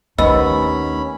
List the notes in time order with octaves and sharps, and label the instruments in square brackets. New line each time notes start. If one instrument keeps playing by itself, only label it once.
[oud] D#2 B3 [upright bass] A3 D4 [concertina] C#4 B5 [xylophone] D#5 E6